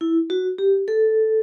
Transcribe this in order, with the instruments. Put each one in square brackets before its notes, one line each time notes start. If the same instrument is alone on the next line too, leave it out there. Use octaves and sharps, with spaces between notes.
[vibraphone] E4
F#4
G4
A4